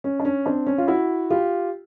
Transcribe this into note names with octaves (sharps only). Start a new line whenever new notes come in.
C#4
D4
C#4
C4 D4
C#4
F4
E4 F#4
F4 G4